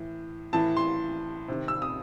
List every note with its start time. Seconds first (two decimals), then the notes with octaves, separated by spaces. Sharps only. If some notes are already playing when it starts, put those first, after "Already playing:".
Already playing: A2 E3
0.53 A2 E3 A5
0.77 C6
1.48 C3 D#3
1.68 E6
1.82 D#6